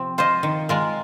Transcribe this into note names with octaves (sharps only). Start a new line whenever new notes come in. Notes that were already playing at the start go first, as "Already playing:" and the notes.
Already playing: C3 F3 C4
F4 C5 D#5
D#3
G#3 F4 A#4